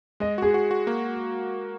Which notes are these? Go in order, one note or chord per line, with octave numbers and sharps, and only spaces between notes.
G#3 D#5
F#4 G#4
F#4
F#4
A#3